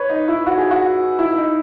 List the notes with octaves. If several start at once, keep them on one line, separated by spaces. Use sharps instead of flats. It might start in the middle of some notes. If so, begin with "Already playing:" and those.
Already playing: B4 C#5
D#4
E4
F#4
G#4
F#4
E4
E4
D#4